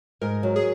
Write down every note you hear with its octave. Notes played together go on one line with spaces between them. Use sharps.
G#2 A#4
F#3
G#4